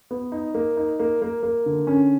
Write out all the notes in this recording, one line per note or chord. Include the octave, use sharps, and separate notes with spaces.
B3
D#4
A#3
D#4
A#3
A#3
A#3
D3
C#4